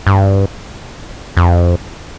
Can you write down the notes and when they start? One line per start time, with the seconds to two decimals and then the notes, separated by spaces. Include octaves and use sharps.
0.07 G2
1.37 F2